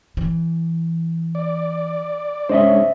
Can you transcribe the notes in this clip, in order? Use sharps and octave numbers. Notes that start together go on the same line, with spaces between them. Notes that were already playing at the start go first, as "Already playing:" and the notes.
E3
D5
G#3 C#4 D4 C5 D#5 E5